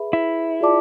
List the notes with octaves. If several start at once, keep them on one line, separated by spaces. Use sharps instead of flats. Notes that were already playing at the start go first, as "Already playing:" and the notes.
Already playing: G#4 B4 E5 B5
E4
F4 G#4 D5 A5 D6